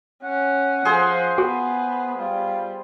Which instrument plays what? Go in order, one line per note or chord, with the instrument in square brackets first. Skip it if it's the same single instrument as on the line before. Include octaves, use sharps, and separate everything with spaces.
[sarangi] C#4 [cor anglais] F#5
[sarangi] F3 [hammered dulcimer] G#4 C5
[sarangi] B3 [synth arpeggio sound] F#4
[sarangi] G3 [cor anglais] F4